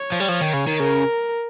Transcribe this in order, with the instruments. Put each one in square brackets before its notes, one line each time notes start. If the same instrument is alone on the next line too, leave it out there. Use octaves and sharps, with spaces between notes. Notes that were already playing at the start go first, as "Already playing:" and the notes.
Already playing: [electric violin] C#5
[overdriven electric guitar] F3
G3
F3
D#3
C#3
D#3
[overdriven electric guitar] C#3 [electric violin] A#4